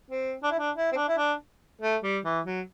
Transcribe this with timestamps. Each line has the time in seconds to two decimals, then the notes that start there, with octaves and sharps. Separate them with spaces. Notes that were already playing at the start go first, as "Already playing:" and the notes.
0.10 C4
0.43 D4
0.51 E4
0.59 D4
0.76 E4
0.92 C4
0.96 D4
1.08 E4
1.18 D4
1.81 A3
2.03 G3
2.25 E3
2.46 F#3